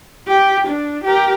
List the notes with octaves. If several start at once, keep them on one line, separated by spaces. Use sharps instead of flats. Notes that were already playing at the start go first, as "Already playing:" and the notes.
G4
D4
G4 A#4